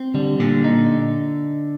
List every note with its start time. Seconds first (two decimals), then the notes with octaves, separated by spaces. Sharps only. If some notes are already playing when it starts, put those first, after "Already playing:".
Already playing: C4
0.14 D3 G3
0.40 A#2 D3
0.64 D#4